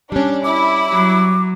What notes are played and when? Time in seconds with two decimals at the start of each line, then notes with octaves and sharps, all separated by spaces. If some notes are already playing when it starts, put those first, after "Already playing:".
0.12 G3 C#4 D4
0.44 E4 D6
0.89 F#3